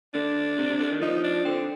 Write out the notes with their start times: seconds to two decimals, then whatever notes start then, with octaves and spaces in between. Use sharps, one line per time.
0.14 D3 D4
0.59 C3
0.70 C3
0.80 D3
0.91 D#3
1.01 F3 D#4
1.24 D4
1.45 D3 C4